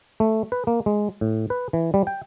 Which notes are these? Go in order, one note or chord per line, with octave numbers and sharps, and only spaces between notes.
A3
B4
A#3
G#3
A2
B4
E3
G3
G5